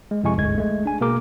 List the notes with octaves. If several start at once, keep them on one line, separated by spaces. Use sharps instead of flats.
G#3
F2 C3 G#3 E4 G#5 C#6
G1 D2 G#2 D3 G#3 G#6
G#3 A3
D4 G#5
B2 A#3 G#4 A#4 D6